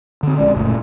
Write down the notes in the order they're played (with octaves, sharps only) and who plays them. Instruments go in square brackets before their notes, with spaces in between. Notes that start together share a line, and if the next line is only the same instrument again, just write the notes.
[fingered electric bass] D3 C4
[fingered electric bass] A#1 G#3 C#4 [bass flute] D5
[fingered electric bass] F#1 A#2 C#3 [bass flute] A3